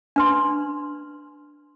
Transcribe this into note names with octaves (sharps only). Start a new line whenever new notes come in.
D4 B4 C6